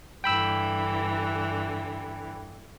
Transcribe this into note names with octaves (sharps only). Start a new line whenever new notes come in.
G2 D3 E3 G5 B5 E6